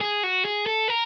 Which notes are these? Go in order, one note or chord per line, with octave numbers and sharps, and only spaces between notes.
G#4
F#4
G#4
A4
A#4